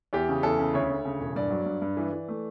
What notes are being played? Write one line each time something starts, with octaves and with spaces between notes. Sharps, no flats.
E2 G4
C#3
E2 A4
C#3
D2 C#5
D2
C#3
E1
G2 D5
F#3
G2
G2
E3
E3
A3